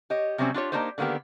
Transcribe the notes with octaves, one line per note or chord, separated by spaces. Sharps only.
G4 C#5 D#5
C3 F#3 G3 C4 C#4
D4 F4 G4 C#5
A#3 D4 D#4 F4 G4 C5
D3 D#3 A#3 B3 G4